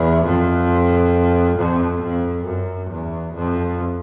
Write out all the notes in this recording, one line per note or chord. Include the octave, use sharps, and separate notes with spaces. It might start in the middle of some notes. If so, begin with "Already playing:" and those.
Already playing: E2
F2
F2
F2
F#2
E2
F2